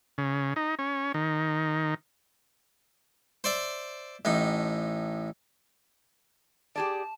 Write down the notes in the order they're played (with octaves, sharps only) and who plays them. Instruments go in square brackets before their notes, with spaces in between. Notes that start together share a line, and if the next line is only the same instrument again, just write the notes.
[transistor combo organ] C#3
D#4
C#4
D#3
[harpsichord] C5 D5 E5
A1 A2 D#4
[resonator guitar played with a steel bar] G4 G#4 D5 [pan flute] A5